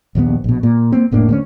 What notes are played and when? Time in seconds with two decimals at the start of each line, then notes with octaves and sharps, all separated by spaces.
0.15 A#1 D#2 E3 B3
0.44 A#1 B2
0.63 A#2
0.92 A#3 C4
1.11 F1 A2 A#3 D4
1.29 D2 A3 C#4